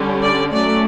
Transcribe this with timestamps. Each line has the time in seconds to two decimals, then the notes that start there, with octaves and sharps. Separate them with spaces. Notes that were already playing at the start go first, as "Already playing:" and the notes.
Already playing: D3 G3 C#4
0.22 D5
0.52 F#3 A3 C#4 D5